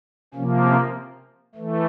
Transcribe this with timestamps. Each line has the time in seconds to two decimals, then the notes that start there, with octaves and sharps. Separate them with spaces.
0.34 C3 F3 A#3 C#4
0.65 C#4
1.55 E3 A3